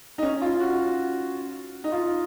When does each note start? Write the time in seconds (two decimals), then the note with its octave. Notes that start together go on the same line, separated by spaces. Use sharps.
0.18 D#4
0.23 C#4
0.42 F4
0.60 F#4
1.84 D#4
1.92 F4